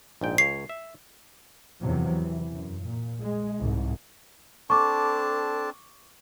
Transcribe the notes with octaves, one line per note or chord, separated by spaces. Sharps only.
A#1 G#2 G5
C#2 C#5 C7
E5
E2 C3 F3 F#3
E3
F#2
A#2
G#3
C2 G#2
C4 D4 A4 A5 C#6 D6